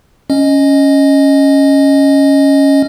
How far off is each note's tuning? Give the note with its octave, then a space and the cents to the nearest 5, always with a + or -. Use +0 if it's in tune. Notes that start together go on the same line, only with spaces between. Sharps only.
C#4 +0 D#5 +0